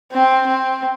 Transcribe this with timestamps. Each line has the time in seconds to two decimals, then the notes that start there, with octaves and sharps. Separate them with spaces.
0.13 C4
0.47 C4